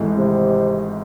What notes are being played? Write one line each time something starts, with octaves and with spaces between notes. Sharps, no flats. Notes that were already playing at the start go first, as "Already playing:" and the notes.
Already playing: G#1 G#2 E3 A3
C3